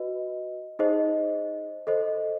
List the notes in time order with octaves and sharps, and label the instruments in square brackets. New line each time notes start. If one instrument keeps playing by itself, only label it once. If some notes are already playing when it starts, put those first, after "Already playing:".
Already playing: [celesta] F#4 B4 D#5
D#4 G#4 C5 D#5
A4 C5 D#5